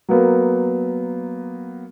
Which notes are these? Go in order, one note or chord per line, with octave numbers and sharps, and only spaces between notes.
F#3 A#3 B3